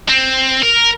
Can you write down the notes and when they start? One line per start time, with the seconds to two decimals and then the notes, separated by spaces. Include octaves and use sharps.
0.09 C4
0.63 A#4